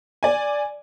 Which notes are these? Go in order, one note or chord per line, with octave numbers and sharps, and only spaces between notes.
D5 G#5